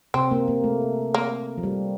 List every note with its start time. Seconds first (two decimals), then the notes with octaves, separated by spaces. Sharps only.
0.14 C3 C4
0.31 A#3
0.48 A#3
0.64 A3
1.14 A#3
1.58 F3
1.63 G3